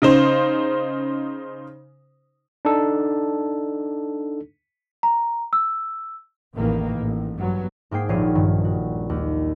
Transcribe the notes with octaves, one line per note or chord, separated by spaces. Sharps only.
C#3 D#4 C5
D4 D#4 A4
A#5
E6
A1 E2 D#3 E3 A#3
A1 A2
G2 F#3 B3
G#2 A#3 G#4 G5 C7
D#1 A#1 C#5 C7 D#7
G2 D#3
F#4
D#2